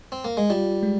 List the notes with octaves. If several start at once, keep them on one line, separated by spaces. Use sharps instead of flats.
C4
A#3
G#3
G3 F4
G#3